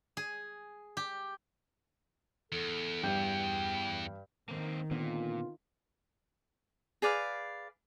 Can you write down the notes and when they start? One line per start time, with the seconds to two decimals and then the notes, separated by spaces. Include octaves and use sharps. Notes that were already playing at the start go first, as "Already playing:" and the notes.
0.17 G#4
0.97 G4
2.52 E2 A4
3.03 G2 G4 G5 G6
4.49 D#3 A#3 C4
4.91 A#2 D3 B3 C4 F4
7.02 G#4 B4 D5 F5